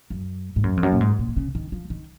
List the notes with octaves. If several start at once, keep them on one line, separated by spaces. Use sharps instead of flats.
F#2
G#2
F#2
F2
F#2
A#2
G#2
A#2
D#3
C#3
D#3
F3
D#3